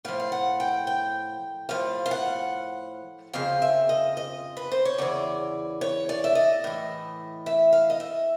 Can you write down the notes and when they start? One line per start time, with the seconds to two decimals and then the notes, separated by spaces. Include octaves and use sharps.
0.05 A2 F3 F5
0.20 F5
0.32 F#5
0.60 G5
0.87 G5
1.69 A2 F3 F5
2.06 F5
2.11 F#5
3.33 F2 C#3 F3 F5
3.62 E5
3.89 D#5
4.17 D#5
4.57 B4
4.71 C5
4.85 C#5
4.98 E2 C#3 E3 D5
5.81 C#5
6.09 D5
6.24 E5
6.35 D#5
6.64 A2 E3
7.46 E5
7.73 F5
7.90 D#5
8.00 E5